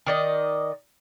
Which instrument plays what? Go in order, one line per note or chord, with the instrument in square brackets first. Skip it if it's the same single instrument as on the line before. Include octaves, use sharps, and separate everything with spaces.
[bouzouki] D#3 D5 D#5